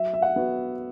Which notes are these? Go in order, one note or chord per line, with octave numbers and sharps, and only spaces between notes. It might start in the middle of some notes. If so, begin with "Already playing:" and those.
Already playing: F#3 E5
E5
F#5
B3 F#4